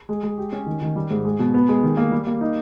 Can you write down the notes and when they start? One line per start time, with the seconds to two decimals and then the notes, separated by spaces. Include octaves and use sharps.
0.09 G#3
0.23 G#3
0.38 G4
0.52 C#4
0.66 D#3
0.81 D#3
0.96 G3
1.11 G#2
1.25 G#3
1.39 B2
1.54 B3
1.69 G#3
1.83 D#3
1.97 A#3
2.12 G3
2.27 A#3
2.41 D#4